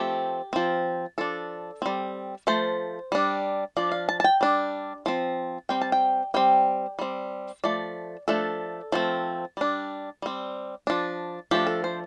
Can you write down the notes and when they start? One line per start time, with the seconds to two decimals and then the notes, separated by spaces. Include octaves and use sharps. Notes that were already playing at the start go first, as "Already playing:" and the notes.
Already playing: F3 A3 C4 G4
0.53 F3 C4
1.18 F3 D4 A4
1.82 G3 C4
2.47 F3 A3 C5
3.12 G3 D4
3.77 F3 D4 D5
3.92 F5
4.09 A5
4.20 A5
4.24 G5
4.41 G3 D4
5.06 F3 C4
5.69 G3 C4 G5
5.81 A5
5.92 G5
6.34 G3 C4 G5
6.99 G3 C4
7.64 F3 A3 D5
8.28 F3 A3 D4 A4
8.92 F3 A3 C4
9.57 G3 D4
10.22 G3 C4
10.87 F3 D4
11.51 F3 A3 D4 G4
11.67 A4
11.84 C5